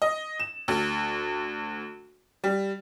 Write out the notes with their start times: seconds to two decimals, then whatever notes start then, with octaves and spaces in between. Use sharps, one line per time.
0.02 D#5
0.40 E7
0.68 D2
2.44 G3